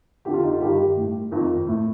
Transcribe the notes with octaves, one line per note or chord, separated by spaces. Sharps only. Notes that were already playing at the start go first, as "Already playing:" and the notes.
F2 D3 G4
F4
D#4
F4
G2 D#3 G4
A2
F2 D#3
A2